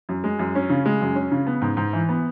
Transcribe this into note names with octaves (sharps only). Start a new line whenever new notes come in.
F#2
G#3
F#2
C#4
C#3
G#3
F#2
C#4
C#3
B3
G#2
G#2
E3
B3